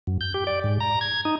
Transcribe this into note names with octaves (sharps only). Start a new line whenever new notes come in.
F#2
G6
G4
D5
G#2
A#5
G#6
D#4